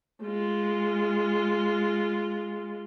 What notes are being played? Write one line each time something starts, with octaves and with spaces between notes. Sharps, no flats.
G#3 F4